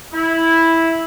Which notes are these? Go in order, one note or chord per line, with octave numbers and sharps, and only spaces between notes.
E4